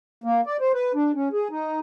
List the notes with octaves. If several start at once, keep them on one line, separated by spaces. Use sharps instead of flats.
A#3
D5
C5
B4
D4
C#4
G#4
D#4